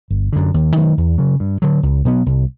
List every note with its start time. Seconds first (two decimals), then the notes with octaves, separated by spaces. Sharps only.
0.10 G1
0.33 F#2 D3
0.54 D#2
0.76 D#3 F#3 A3
0.97 E2
1.18 C#3 F#3
1.40 G2
1.62 D3 F#3
1.83 C#2
2.05 B2 F#3 B3
2.26 C2